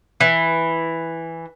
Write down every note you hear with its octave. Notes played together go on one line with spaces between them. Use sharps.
E3